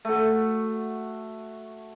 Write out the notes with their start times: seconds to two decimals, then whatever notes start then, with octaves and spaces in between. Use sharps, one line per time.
0.05 A3 F#4